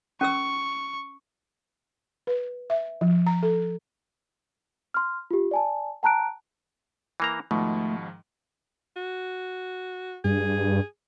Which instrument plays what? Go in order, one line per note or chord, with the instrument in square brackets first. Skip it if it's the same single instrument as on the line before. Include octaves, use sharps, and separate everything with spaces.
[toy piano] C#4 A#4 E6 [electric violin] C#6
[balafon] B4
E5
F3
A#5
A4
[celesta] C6 F6
F4 G4
D5 G#5 A5
G5 A5 A#5 F#6 D7
[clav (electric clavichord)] E3 A#3 A#5
[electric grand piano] G#2 D#3 F3 [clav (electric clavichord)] B2 [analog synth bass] A3
[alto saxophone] F#4
[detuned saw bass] G2 [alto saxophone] G#4